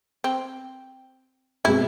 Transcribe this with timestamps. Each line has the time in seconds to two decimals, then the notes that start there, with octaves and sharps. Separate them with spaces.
0.24 C4
1.65 B2 G#3 C4 E4